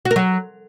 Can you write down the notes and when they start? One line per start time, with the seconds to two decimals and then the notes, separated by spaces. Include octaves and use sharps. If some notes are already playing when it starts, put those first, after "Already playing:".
0.05 F#4
0.11 A#4
0.16 F#3